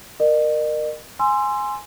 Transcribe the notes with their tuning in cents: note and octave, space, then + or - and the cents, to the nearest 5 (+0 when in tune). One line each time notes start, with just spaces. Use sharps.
A#4 +0 D#5 -45
G#5 +0 C6 +0 E6 +30